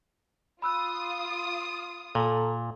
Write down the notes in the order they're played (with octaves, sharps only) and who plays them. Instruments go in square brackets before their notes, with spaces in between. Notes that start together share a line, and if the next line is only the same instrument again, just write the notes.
[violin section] F4 D#6 [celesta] B5 E6 F#6
[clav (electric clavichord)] A#2 [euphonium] A4